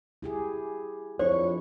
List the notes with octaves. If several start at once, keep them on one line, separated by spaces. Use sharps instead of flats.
E4 G4 G#4
F2 D4 E4 C5 C#5